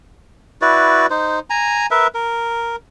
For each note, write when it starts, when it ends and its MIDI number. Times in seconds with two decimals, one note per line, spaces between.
0.62 1.06 64
0.62 1.06 66
0.62 1.06 71
0.62 1.06 74
1.10 1.39 63
1.10 1.39 72
1.50 1.86 80
1.50 1.86 82
1.91 2.07 70
1.91 2.07 71
1.91 2.07 76
2.15 2.76 70